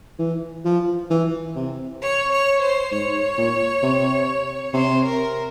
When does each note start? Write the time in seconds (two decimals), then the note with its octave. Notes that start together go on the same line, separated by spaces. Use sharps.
0.19 E3
0.65 F3
1.10 E3
1.56 C3
2.01 C#5
2.32 C#5
2.62 C5
2.92 G#2 C#5
3.38 A#2
3.83 C3
4.74 C3 C5
5.04 A#4